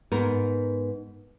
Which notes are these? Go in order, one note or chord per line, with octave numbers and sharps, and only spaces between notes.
G#2 B3 A#4